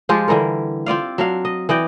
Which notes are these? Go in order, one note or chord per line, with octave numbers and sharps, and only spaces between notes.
F3 G#3 F4 G4
D3 E3 G3 A#4
C4 F4 D5 F5
F#3 D4 F5
D#5
E3 D5 D#5 G5